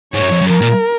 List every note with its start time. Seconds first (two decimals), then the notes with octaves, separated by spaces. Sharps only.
0.14 G#2 C#5
0.22 F#2
0.32 F2
0.41 F#2
0.50 F2 A#4
0.62 A#2